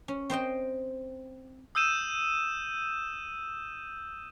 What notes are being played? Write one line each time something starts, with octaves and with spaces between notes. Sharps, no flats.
C#4
C4 C5 D#5 G5
D#6 E6 G6 D#7 E7